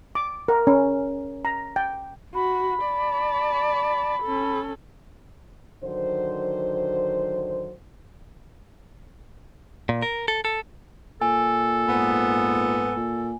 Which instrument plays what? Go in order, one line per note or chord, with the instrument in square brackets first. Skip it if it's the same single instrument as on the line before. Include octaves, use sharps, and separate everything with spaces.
[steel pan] D6
A#4
C#4
A#5
G5
[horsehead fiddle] F#4 [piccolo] B5
[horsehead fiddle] D5 A5
C#4 A4
[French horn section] D3 D#3 F#3 C5
[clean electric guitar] A#2
A#4
A4
A4
[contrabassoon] A#2 [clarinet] A4 [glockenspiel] G#5
[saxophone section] G#2 B3
[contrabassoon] A#2